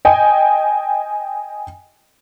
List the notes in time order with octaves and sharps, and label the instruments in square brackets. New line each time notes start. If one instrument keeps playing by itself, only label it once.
[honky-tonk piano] D#5 G5 G#5